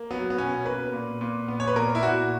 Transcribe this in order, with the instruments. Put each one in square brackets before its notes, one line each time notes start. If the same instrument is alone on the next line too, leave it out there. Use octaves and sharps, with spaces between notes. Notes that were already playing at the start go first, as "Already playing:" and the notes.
Already playing: [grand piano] A#3
F#3 B3
B3
B2 C#4
A#3 B4
A#2
A#2
B3
C#5
B4
A#2 A#4
E4
A#2 F#4